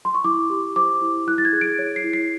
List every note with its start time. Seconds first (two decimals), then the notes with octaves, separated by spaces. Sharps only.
0.05 C6
0.14 C#6
0.24 E4 D6
0.50 G4
0.76 C5 D6
1.01 E4
1.27 E4 F#6
1.38 A6
1.45 G#6
1.53 G#4
1.61 D7
1.79 C#5
1.96 C7
2.04 E4
2.13 C7